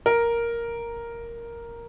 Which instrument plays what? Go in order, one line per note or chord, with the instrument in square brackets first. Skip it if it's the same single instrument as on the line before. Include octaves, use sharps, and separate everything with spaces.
[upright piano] A#4